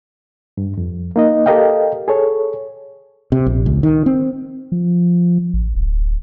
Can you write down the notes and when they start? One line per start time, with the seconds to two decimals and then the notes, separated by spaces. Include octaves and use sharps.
0.57 G2
0.78 F2
1.16 A#3 D#4 D#5
1.46 G4 A4 A#4 D#5 F5 G5
2.08 G#4 A4 C#5
3.32 C3
3.46 A#1
3.66 C#2
3.83 D#3
4.06 C4
4.72 F3
5.54 A1
5.75 D1